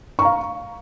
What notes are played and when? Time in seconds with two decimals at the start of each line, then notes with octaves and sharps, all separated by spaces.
0.19 C#6
0.22 A#5
0.25 F5